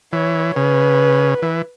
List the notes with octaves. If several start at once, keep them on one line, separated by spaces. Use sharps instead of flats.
E3 C#5
C#3 B4
E3